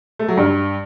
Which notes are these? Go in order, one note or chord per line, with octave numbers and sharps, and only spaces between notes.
A3
F#3
G2